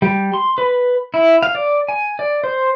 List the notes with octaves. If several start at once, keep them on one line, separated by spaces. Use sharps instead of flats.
G3
C6
B4
E4
F5
D5
G#5
D5
C5